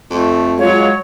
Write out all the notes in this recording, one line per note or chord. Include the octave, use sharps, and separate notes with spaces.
F2 A3
F#3 G#3 F4 C#5